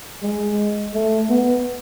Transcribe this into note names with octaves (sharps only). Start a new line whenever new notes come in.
G#3
A3
B3